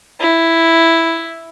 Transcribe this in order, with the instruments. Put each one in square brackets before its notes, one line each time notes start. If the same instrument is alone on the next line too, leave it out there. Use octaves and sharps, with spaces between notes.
[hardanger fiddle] E4